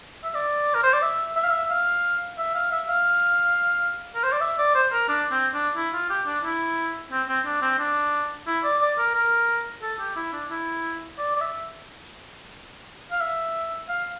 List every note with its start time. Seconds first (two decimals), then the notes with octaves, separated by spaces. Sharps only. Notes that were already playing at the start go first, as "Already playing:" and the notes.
0.24 E5
0.35 D5
0.75 A#4
0.84 C5
0.93 D5
1.02 E5
1.36 E5
1.44 F5
1.51 E5
1.71 F5
2.38 E5
2.55 F5
2.72 E5
2.89 F5
4.15 A#4
4.24 C5
4.32 D5
4.41 E5
4.58 D5
4.75 C5
4.92 A#4
5.09 D4
5.31 C4
5.54 D4
5.76 E4
5.94 F4
6.10 G4
6.27 D4
6.44 E4
7.12 C4
7.29 C4
7.46 D4
7.62 C4
7.79 D4
8.47 E4
8.64 D5
8.81 D5
8.98 A#4
9.15 A#4
9.82 A4
9.99 G4
10.16 E4
10.33 D4
10.50 E4
11.18 D5
11.36 D5
11.41 E5
13.11 F5
13.21 E5
13.89 F5